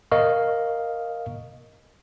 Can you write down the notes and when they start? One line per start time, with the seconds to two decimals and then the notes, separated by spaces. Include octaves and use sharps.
0.12 A#4 D#5 F5 C#6